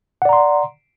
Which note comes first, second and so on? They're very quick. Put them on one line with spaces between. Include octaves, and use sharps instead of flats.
F#5 D5 A#5 C6